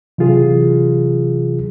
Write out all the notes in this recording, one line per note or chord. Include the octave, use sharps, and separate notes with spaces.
C3 E3 F#3 F4 G#4